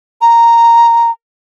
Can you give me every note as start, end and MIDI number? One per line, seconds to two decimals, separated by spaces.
0.21 1.11 82